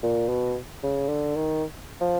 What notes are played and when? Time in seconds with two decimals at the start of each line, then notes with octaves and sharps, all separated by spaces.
0.03 A#2
0.29 B2
0.83 C#3
1.09 D3
1.36 D#3
2.01 F3